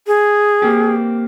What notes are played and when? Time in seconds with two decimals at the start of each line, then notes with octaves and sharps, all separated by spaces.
0.07 G#4
0.62 A#3 C4 G4